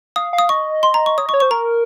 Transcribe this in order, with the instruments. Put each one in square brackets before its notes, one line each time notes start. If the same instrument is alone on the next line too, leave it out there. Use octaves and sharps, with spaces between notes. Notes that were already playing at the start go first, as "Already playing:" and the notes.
[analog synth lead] F5 [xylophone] D#6
[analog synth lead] F5
[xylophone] D#6
[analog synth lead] D#5 [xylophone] C#6
[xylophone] C6
A#5
C#6
[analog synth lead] C#5 [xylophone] D#6
[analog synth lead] D#5 [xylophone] C#6
[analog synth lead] C#5
[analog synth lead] C5 [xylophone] C#6
[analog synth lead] A#4 [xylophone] A#5